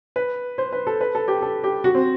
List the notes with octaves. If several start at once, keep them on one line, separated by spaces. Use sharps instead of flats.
B4
C5
B4
A4
B4
A4
G4
A4
G4
F#4
C4